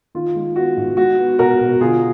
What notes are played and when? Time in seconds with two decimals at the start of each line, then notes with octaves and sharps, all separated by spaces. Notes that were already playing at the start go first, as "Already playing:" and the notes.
0.15 D#3 F4
0.35 G#3
0.56 B3 F#4
0.77 G#2
0.97 G#3 F#4
1.18 B3
1.39 B2 F#4 A#4
1.60 B2
1.81 D3 F4 G#4